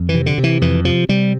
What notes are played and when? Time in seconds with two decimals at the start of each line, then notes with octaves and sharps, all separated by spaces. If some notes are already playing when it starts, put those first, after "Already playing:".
Already playing: F2
0.09 E3
0.15 C3
0.26 D3
0.38 C3
0.44 E3
0.61 F2 E3
0.85 C3 F3
1.09 C3 G3